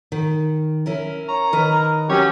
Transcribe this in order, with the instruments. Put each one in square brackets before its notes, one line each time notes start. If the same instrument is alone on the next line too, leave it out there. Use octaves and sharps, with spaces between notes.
[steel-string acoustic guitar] D#3
C#4 E4 A#4
[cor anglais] C#5 [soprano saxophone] A#5
[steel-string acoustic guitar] D#3 B4 D#5 [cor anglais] A#4
[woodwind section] F#3 C#4 [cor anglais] G4 [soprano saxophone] C#5